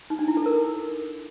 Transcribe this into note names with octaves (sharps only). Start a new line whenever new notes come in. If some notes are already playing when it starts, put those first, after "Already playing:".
D#4
D4
E4
A4
A#4